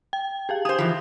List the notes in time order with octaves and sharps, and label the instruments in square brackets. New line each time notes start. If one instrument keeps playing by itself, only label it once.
[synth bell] G5
G4 G#4 F5
[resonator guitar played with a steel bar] G#4 C5 [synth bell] D#6
[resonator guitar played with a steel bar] E3 F3